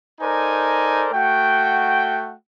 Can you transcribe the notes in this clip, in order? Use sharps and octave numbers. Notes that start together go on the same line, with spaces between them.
D#4 A4 A#4 C5 D5 G#5
A3 F#4 F#5 G5